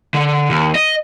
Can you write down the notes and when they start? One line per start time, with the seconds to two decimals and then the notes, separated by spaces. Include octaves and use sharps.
0.14 D3
0.51 D#2
0.75 D#5